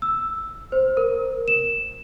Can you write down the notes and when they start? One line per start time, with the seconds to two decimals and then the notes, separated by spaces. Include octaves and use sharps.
0.02 E6
0.72 C5
0.97 A#4
1.48 E7